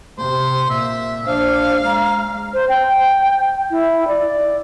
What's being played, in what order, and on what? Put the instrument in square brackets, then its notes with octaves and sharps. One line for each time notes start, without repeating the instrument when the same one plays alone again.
[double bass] C3 [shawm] C5
[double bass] A#2 [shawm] E5
[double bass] A#1 D4 [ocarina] C5 [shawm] F5
[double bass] G#3 [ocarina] A#5
[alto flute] C5
G5
E4
D5